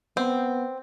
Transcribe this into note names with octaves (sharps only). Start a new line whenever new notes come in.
B3 C4